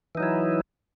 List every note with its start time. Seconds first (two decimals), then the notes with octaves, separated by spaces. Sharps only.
0.15 E3
0.17 D#4
0.20 F#3
0.23 E4